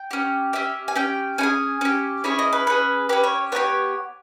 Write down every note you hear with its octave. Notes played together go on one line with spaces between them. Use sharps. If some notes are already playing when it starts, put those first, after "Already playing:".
Already playing: G5
C#4 G4
C#4 G4 E5
G#5
C#4 G4 G5
C#4 E4 G#5
G#4
C#4 G4
C#4 E4 G#4 C#5
D#5
B4
C#4 G#4 B4
C#4 G4 B4
C#5
B3 D#4 G4 C#5